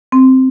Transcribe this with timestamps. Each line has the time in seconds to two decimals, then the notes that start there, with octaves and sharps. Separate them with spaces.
0.12 C4